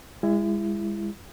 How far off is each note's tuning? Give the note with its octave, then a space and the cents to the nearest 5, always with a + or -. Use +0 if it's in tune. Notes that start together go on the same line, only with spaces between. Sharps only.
G#3 -30 E4 +20